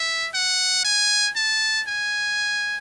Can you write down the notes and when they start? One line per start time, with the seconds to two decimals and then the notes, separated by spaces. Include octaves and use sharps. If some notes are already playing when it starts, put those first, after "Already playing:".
Already playing: E5
0.34 F#5
0.84 G#5
1.36 A5
1.87 G#5